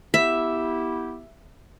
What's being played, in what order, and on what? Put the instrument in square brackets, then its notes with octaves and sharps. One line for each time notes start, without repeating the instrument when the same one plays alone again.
[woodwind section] B3 E4 G4 [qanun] E5